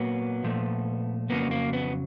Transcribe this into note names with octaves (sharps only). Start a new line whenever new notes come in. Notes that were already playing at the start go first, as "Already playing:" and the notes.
Already playing: A#2 F#3 A#3 B3
A#2 F3 A3
F2 C#3 F#3 A#3 B3
A#3
B3